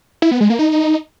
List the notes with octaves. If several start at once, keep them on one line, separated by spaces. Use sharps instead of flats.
E4
B3
G#3
A#3
D#4